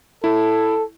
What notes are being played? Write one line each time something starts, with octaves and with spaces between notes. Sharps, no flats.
E4 A4